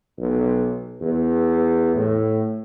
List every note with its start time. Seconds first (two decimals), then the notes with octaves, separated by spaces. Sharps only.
0.18 B1
1.01 E2
1.95 A2